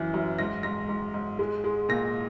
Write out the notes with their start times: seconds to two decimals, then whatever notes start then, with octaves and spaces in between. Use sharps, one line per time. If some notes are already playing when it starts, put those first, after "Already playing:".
Already playing: F#2 E3
0.14 F#2
0.39 G#2 A#6
0.63 G#2 A#6
0.89 G#2
1.14 G#2
1.39 G#3
1.64 G#3
1.89 A#2 A#6